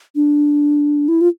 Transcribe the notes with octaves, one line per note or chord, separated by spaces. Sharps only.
D4
E4
F4